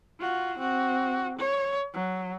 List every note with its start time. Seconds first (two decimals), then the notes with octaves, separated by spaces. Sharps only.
0.20 F4 F#4
0.58 C4 F#4
1.39 C#5
1.93 F#3